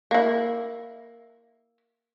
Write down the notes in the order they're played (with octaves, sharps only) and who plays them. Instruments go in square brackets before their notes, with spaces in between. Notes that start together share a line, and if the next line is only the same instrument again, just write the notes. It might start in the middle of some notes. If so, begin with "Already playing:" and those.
[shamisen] A#3 E4